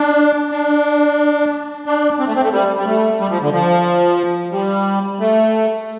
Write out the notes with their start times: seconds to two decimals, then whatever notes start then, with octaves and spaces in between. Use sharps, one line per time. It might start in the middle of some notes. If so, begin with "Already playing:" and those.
Already playing: D4
0.51 D4
1.86 D4
2.19 C4
2.27 A3
2.36 C4
2.43 A3
2.53 G3
2.79 G3
2.86 A3
3.20 G3
3.30 F3
3.42 D3
3.53 F3
4.52 G3
5.20 A3